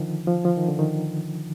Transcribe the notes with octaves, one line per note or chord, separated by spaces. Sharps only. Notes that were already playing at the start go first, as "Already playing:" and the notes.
Already playing: D3 D#3 F3
F3
F3
D#3
D3
D#3